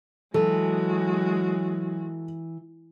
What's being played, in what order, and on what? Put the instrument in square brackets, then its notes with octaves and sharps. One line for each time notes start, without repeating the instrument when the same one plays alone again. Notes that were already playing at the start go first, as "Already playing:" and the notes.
[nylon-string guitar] E3 [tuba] F#3 [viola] G#3 F#4 [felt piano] A4